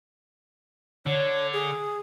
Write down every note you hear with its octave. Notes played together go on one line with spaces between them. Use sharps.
D3 C#5
G#4